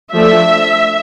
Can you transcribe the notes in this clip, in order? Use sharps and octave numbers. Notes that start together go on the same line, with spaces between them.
F3 A3 D4 E5